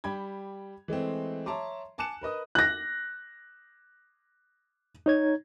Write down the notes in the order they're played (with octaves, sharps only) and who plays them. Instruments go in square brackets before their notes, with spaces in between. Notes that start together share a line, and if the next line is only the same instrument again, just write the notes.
[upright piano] G3 G4 G5 B5 G#6
E3 G#3 A3 C4
C#5 E5 A5 A#5 C6 D6
G#5 A5 D6 F#6 C#7 E7
A#4 B4 D#5 D#6
[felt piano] F#6 A#6
[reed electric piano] D#4 C#5 G#6